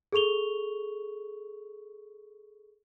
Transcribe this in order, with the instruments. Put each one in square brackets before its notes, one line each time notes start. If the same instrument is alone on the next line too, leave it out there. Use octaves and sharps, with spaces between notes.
[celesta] G#4 A4 C#6 F7 G7